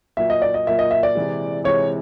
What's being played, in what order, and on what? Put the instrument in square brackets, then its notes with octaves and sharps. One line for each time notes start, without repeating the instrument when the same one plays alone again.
[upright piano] A#2 F#3 A#3 [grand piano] E5
[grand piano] D#5
D5
D#5
[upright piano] A#2 F#3 A#3 [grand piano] E5
[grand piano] D#5
E5
D5
[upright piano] C3 E3 G#3
[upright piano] C3 E3 G#3 [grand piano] C#5